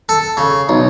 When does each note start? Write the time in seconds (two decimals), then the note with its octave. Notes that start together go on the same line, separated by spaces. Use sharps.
0.09 A4
0.37 C#3
0.69 B1